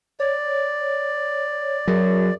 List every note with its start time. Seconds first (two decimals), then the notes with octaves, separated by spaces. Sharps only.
0.20 C#5 D5
1.88 F#2 F#3 G#4